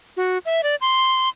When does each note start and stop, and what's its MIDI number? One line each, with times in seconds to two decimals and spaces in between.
0.17 0.38 66
0.46 0.61 76
0.63 0.75 74
0.81 1.29 84